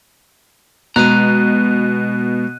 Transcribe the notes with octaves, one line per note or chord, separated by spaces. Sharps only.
B2 G#3 A#5 F#6 D#7